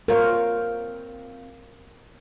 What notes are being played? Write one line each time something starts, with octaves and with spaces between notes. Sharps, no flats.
C4 F4 A#4 C#5